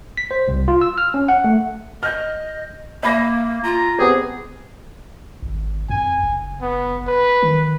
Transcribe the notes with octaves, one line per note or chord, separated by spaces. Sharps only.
B6
C5
C2
F4
E6
F6
C#4
F#5
A3
D#5 F6 G6
A#3 E5 B5 A#6
F4 A#5
B3 C4 G4 G#4
G#1
F2 G#5
F#1
B3
B4
D#3